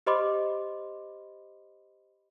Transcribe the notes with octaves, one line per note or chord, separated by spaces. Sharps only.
G4 C5 D#5 B5 C6 D6